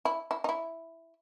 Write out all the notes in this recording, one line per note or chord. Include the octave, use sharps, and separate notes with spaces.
E4
E4
D#4
E4